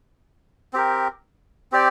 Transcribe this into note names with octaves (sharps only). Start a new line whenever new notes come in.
C4 G4 A#4
C4 G4 D5